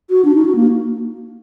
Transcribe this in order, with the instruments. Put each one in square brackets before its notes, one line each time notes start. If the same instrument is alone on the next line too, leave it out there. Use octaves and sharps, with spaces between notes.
[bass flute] F#4
D4
D#4
F#4
A#3